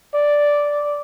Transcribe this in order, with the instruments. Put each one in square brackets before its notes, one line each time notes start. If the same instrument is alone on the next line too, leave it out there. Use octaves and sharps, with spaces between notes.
[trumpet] D5